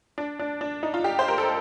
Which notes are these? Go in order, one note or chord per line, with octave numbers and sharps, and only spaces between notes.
D4
D4
D4
D#4
F4
G4
C5
A#4
A4